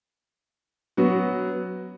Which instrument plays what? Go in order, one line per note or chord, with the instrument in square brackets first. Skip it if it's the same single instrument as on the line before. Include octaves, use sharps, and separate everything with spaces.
[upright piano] F#3 B3 F#4